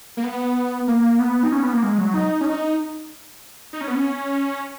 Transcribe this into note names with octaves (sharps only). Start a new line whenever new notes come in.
A#3
B3
A#3
B3
D#4
C#4
B3
A#3
G#3
F#3
D#4
C#4
D#4
D#4
C#4
B3
C#4